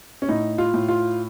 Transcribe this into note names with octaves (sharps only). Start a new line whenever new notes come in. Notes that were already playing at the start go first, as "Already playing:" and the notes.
C#4
A2 D#4
F4
A2
F4